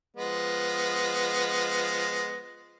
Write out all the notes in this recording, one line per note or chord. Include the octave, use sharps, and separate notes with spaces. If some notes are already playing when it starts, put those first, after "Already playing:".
F3 G#3 B3